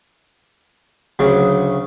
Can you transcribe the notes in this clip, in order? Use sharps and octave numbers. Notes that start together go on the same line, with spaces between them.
D2 C#3 F#3